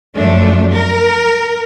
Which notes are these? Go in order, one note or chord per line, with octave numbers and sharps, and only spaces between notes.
F#2 F3 A3 D4
A#4